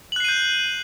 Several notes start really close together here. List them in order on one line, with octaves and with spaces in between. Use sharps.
F#7 F#6 C7 D#7 G6